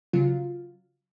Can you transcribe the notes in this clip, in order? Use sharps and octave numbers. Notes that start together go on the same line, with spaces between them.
C#3 F#3 F4